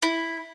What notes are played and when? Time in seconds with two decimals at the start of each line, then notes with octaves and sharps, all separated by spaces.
0.02 E4